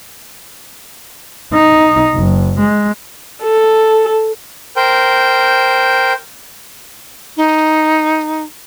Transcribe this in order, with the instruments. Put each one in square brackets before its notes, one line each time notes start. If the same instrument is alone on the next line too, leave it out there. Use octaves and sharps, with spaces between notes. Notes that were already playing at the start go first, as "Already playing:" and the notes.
[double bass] D#4
F#1
G#3
[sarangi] A4
[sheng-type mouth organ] A#4 C5 G5
[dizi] D#4